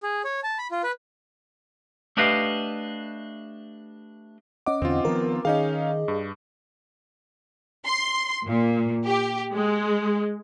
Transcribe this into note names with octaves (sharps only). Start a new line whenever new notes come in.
G#4
C#5
A5
B5
F4
B4
A3 D4 G4 B4 D#5 F5
C#4 D#5 F#5 D6
E2 D3 C4 F4
D#3 F3 B3 A#4
D#3 C#4 D#4 G#4 D#5 F5
G2
C6
A#2
G4
G#3